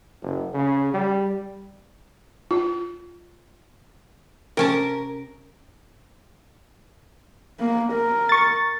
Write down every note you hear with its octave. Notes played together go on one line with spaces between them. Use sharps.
F#1
C#3
G3
F4
C3 C#4 A#4 A5
A#3
A#4
C#6 A6